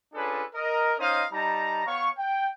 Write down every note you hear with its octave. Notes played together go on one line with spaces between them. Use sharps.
C#4 D4 F4 G#4 A4 B4
A#4 D#5
C#4 D#4 C5 D#5 F5 D#6
G3 D#4 A5 A#5
B3 C#5 F5 C#6
G5